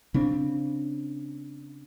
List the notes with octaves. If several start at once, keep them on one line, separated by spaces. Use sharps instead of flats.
C#3 C4 D4